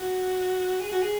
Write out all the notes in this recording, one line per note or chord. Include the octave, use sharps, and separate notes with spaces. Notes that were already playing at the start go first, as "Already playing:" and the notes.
Already playing: F#4
G#4
F#4
G#4